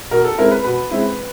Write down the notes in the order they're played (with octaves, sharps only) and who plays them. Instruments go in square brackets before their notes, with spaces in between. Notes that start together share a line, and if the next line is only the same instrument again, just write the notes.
[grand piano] B2 A#4
A4
G#3 C4 E4 A#4
B4
B2 B4
G#3 C4 E4